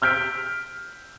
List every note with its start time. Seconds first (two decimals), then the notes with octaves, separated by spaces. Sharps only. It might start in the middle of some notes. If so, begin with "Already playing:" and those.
0.02 E6 F6 G6 B6 D7